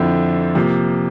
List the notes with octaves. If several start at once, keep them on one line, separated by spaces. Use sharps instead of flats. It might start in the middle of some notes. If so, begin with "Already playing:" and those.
Already playing: F2 D3 F3 C4 E4
C3 F3 A#3